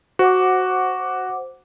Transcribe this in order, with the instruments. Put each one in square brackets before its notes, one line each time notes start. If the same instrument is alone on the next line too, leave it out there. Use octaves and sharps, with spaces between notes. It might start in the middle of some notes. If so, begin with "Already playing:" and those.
[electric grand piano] F#4 [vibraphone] C5 F#5 D6